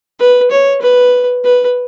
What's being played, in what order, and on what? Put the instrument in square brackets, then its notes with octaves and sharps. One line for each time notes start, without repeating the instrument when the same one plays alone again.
[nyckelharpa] B4
C#5
B4
B4